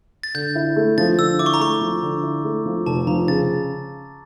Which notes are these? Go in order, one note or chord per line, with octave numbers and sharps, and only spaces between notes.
A6
D3 G6
E4
A3
F3 A6
D3 E6
E4 D6
C#6
A#5
A3 C#6
F3
D3
E4
A3
F3
F1 A5
F3 A#5
C#3 A6